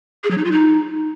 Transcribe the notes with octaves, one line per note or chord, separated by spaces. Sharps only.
G#4
F#3
D#4
F4
D#4